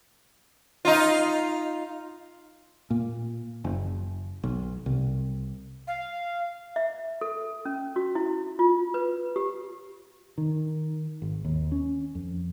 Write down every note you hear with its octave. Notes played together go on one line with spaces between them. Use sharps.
D#4 F4
A#2
F#1
B1
C2
F5
E5
A4
C#4
F#4
E4
F4
B4
G4
D#3
G#1
D#2
C#4
F2